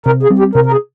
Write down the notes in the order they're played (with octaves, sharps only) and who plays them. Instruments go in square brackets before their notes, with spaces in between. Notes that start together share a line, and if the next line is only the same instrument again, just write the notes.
[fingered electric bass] C3 [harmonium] A#4
[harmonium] G#4
[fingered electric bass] G3 C4
[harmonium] G4
[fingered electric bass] C3 [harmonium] A#4
[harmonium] A#4
G#4